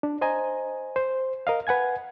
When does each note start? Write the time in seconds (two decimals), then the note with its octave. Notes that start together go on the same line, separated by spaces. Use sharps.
0.03 D4
0.21 C5 D#5 G#5 A#5
0.96 C5
1.47 A#4 D#5 F5
1.67 B4 F#5 G#5 G#6